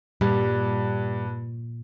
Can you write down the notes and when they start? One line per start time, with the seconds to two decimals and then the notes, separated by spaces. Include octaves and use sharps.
0.21 G2 A#2 G3